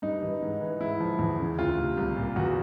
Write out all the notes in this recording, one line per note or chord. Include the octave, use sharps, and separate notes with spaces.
G2 D#4
E3
G#2
E3
G#2 E4
F3
E2
C#3
D2 F4
C3
C2
A#2
E2 F#4